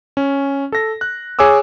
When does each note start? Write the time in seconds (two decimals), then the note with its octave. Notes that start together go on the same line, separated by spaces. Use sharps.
0.17 C#4
0.72 A4 A#6
1.01 F#6
1.39 G#4 C#5 G#5 D6 E6